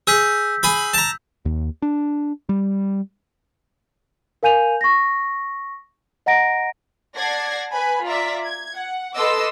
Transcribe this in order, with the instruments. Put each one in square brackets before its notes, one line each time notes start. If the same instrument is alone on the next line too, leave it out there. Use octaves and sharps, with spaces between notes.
[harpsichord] G#4 [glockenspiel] E6 G6 B6
[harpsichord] G#4 B5
A5 A#5
[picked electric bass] D#2
D4
G3
[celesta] A#4 F5 G#5 G6 D#7 F7
C#6 A#6
D#5 F#5 A#5 A#6 D7
[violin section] D5 F#5 A5 G#6 A#6 C7
B4 G#5 B5
F4 D5 E5 A#5 B6
G#6
F#5
A4 B4 D#5 C6 D6 E6